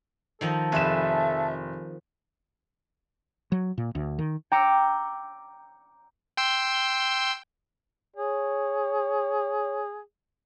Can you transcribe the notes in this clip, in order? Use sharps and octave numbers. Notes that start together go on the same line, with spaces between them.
D#3 F3 A4 D#5
F1 G#4 B4 E5 E7
F#3
A#2
D2
D#3
G5 A#5 D6 E6 C#7 D7
G5 C6 E6
G#4 C#5